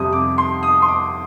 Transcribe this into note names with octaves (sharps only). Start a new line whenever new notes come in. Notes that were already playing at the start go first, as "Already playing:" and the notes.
Already playing: F2 C3 G3 D#6
D6
C6
D#6
C6
D6